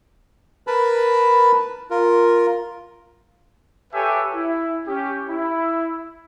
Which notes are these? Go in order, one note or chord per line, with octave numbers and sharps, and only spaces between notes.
A#4 B4 A5 B5
F4 A#4
G4 A4 B4 C#5 E5 G#5
E4
C#4 G4
E4